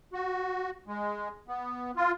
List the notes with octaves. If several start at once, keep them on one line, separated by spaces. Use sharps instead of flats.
F#4
G#3
B3
F4